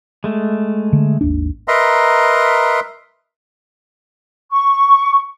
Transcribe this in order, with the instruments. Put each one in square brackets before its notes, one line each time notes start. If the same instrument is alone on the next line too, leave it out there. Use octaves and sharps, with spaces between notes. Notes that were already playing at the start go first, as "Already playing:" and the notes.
[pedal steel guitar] G#3 A3
[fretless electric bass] D3
G#1 D#2 D4
[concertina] A#4 B4 D#5 E5 A#5 C6
[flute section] C#6